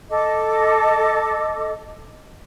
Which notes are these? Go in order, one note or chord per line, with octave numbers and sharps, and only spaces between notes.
A4 D#5 D6